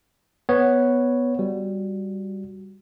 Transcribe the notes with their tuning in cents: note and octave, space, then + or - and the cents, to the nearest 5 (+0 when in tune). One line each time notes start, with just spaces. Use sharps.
B3 +0 C#5 +0
G3 +0 F#4 +0